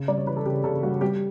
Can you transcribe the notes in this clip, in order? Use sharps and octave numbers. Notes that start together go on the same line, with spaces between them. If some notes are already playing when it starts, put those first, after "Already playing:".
Already playing: C#3
G3 D5
C#5
E3 B4
A4
C#3 G4
C#3 A4
G3 F#4
G3 G4